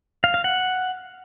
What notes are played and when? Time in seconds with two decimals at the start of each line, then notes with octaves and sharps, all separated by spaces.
0.24 F5
0.34 F5
0.44 F#5